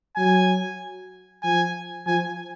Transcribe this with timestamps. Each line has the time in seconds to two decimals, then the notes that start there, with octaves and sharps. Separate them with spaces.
0.16 F#3 G#5
1.43 F3 G#5
2.06 F3 G#5